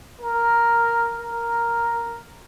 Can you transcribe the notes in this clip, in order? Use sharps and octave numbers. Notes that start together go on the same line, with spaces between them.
A#4
A#4